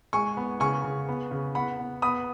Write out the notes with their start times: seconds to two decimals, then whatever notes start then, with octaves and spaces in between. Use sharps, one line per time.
0.13 G#3 G#5 C#6
0.37 B3
0.60 C#3 G#5 C#6
0.84 C#3
1.08 B3
1.31 C#3
1.55 B3 F#5 B5
1.79 B3
2.02 B3 B5 D#6